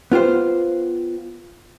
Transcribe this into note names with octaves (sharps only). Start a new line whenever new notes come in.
B3 F4 G4 C5